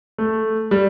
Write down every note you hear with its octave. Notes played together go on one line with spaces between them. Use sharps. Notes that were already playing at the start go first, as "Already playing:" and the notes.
A3
G3